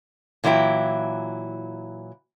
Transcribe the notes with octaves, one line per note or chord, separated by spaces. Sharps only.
A#2 E3 F#3 E4 G5